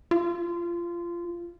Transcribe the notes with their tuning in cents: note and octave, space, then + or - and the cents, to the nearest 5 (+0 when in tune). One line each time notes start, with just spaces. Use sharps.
F4 -20